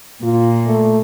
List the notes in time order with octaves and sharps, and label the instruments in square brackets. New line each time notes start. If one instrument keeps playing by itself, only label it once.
[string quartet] A#2 [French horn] F4
[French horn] A3